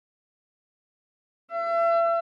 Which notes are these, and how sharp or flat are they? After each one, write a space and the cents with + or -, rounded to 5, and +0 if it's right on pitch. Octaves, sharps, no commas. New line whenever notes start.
E5 +35